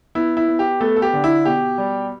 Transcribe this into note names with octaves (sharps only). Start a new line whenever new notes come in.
B3 E4
E4
B3
G4
A3 B3 A4
A4
G4
D3
E4
B2 G4
G3